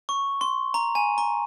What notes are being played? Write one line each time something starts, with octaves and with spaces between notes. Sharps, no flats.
C#6
C6
A#5
G#5
A#5